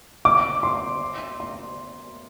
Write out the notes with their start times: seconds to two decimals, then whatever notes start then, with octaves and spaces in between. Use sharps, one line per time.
0.25 D6
0.63 C6
1.40 C6